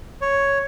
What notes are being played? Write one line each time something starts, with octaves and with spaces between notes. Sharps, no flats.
C#5